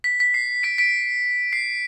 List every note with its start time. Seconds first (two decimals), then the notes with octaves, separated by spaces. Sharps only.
0.04 B6
0.20 B6
0.34 C7
0.63 B6 D7
0.78 B6 D7
1.53 C7